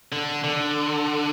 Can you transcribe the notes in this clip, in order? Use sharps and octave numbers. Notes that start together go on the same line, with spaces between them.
D3
D3